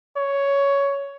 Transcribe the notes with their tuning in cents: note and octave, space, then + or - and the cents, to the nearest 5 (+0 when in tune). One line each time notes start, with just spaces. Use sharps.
C#5 +10